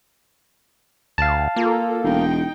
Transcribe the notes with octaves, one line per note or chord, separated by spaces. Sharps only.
D2 F5 A5
A#3 F4 A4
E1 D#4 G5